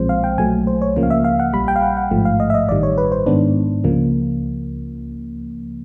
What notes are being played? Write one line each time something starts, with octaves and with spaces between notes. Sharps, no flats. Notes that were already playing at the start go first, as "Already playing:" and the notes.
Already playing: B1 A#2 F3 G#3 C4 C5
F5
G5
B1 A#2 F#3 A3 G#5
C5
C#5
C#2 C#3 F3 A#3
F5
E5
F5
F#5
A#1 A#2 G3 B5
G5
F5
F#5
F#5
A1 G#2 F3 A3
F5
D#5
E5
D#5
A1 G2 D#3 G3 D5
C#5
B4
C5
G#2 D#3 G#3 B3 D4
C#2 C#3 F3 A#3